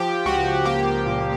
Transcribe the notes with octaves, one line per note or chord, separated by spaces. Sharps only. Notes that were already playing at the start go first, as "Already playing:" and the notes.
Already playing: F3 G4
C#2 F#4
A#3 G4
A#2